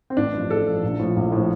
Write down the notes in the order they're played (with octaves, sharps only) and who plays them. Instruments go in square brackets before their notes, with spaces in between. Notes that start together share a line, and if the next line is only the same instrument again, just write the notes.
[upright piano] C4
A1 D4
G2 F3
A1 A4
G2 F3
A#1
A2 F3
A#1
A2 F3